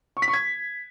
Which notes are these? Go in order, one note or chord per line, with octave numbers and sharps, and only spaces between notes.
C#6
B6
C#6
G#6